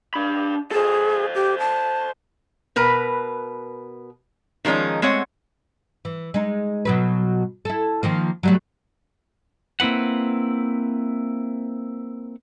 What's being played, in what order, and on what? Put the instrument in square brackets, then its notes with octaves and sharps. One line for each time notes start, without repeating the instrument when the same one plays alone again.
[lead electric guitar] D4 B5
[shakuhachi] G#4 [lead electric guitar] A4 C5
[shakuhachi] G4
A5
[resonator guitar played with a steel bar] B2 A#4 B4
D#3 F3 G#3 C#4 D#4
G#3 A3 C4 C#5 F#5
[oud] E3
G#3 D#4
B2 F#3 B4
E4 A4
D#3 F3 A#3
F#3 G3 A3
[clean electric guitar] A#3 C4 E4 B4 F#5